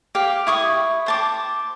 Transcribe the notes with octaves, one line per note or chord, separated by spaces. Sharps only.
G4 F5
E4 C#6 D#6
C5 A5 D6